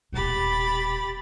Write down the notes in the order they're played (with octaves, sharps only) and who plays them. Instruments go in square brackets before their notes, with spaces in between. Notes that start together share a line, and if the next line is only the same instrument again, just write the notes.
[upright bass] D#1 B2 [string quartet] G4 B5 A6